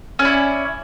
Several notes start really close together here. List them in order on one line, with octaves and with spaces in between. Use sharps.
C#4 D5 E4